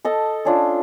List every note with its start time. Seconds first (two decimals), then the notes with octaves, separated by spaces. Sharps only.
0.05 A4 D#5 A5
0.45 C#4 D4 F4